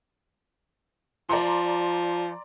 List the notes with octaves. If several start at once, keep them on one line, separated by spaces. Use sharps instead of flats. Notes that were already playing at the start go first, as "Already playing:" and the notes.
F3 D5 A#5 C6